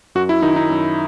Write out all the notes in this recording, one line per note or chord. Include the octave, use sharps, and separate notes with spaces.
F#2 F#4
E4
D#3 D#4
D#4
F#2